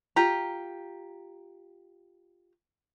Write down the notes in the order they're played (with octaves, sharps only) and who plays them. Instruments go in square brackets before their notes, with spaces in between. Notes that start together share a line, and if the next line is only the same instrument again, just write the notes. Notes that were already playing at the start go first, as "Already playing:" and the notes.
[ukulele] F4 G4 A#5